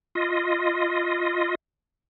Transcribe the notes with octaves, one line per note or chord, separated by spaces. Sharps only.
F4 D#5